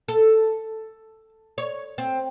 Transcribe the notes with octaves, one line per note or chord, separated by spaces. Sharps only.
A4
C#5
C4